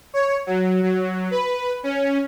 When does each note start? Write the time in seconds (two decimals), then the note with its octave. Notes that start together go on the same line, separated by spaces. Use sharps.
0.14 C#5
0.47 F#3
0.83 F#3
1.31 B4
1.83 C#4